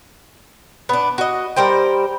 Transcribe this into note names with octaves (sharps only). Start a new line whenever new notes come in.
B3 D4
F#4 D#5
G3 A#4 C5 G5